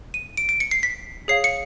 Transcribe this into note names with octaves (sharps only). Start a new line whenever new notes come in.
D#7
D7
D7
C#7
C7
B6
G#4 C#5 F5 C7
C#7